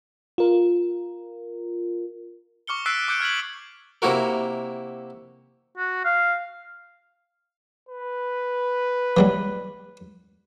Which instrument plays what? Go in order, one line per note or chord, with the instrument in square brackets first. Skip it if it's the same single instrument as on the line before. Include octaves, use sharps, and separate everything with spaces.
[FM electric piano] F4 A#4
[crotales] C#6 D6 F6 C#7 G7
E6 F#6 A6 B6 C7 D7
D6 E6 F#6 G6 C#7 D7
F6 G#6 B6 F#7
[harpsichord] C3 A#3 E4 F#4 A#4
[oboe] F#4
F5
[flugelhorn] B4
[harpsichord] E3 F#3 G3